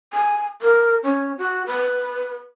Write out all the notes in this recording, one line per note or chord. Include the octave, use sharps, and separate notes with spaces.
G#5
A#4
C#4
F#4
B4